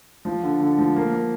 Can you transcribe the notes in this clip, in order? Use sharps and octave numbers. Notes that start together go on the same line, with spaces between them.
F3
D3
D3
F3
A#3
A#3